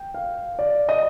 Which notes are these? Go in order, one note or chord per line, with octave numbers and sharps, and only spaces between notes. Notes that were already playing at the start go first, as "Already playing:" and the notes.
Already playing: G5
F5
D5
D#5